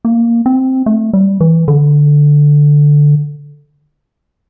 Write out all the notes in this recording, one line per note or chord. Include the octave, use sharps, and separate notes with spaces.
A#3
C4
A3
G3
E3
D3